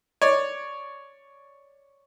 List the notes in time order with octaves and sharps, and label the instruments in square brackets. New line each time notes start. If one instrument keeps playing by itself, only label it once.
[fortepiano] C#5 D5